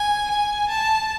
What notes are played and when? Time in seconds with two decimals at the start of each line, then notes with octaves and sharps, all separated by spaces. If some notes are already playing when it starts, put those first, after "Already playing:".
Already playing: G#5
0.31 G#5
0.69 A5